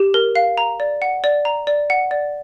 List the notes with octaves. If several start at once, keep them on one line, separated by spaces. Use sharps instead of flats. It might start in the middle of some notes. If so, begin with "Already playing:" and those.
Already playing: G4
A#4
F5
A#5
D5
F#5
D5
A#5
D5
F#5
D5